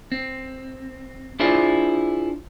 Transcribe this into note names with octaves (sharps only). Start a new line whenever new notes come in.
C4
D4 E4 F4 G#4 C5 D5